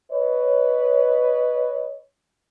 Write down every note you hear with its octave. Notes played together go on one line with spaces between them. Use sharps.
B4 C#5 D#5